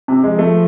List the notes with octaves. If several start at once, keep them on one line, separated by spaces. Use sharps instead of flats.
C3
F3 G#3
A3